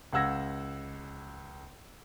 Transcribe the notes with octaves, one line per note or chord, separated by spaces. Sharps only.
C#2 F5 F#5 E6 G#6 A#6